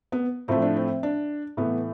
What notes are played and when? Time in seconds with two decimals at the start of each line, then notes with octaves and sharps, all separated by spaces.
0.12 B3
0.48 A2 F3 A3 C4
0.62 D4
0.76 C4
1.03 D4
1.57 A2 E3 A3 B3